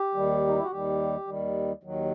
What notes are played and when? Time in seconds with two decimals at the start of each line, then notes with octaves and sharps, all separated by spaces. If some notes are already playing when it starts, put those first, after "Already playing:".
Already playing: G4
0.15 D#2 D#3 G3
0.47 D#4
0.55 E4
0.63 F#4
0.71 D#2 D#3 G3 G4
1.28 D#2 D#3 G3
1.83 D#2 D#3 F#3